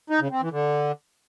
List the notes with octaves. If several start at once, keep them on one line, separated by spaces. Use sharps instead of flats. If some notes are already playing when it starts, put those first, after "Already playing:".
D#4
C#3
C4
E3
D3